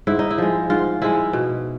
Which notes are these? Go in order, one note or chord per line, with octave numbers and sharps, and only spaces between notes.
G#2 E4
D#4
E4
F3 G#3
G#2 F4
F3 G#3 E4
B2